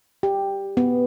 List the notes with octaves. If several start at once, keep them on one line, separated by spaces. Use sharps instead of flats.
G4
B3